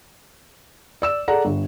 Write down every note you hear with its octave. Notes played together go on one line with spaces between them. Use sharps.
D5 E6 E7
G#4 A4 D5 F#5 A#5
G1